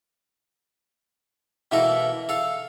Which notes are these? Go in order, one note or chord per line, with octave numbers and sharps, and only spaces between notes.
B2 E3 A#3 A4 A#4
A4 F5